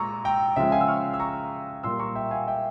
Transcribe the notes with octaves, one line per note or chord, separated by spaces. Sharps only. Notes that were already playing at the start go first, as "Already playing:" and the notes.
Already playing: A#2 G#3 A#5 C#6 E6
G5 A#5
C#3 F3 G#3 E5 G5
F5 G#5
E6
C#6 F6
E6
A#5 C#6
A#2 G3 A#3 C6 E6
A#5 C#6
E5 G5
F5 G#5
E5 G5